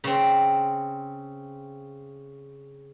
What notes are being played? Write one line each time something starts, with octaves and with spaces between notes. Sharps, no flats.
C#3 C4